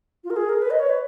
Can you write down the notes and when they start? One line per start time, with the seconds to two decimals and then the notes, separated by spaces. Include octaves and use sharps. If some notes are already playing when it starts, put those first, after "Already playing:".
0.24 F4
0.30 A#4
0.36 G#4
0.49 A#4
0.62 B4
0.71 D#5
0.79 C#5
0.90 B4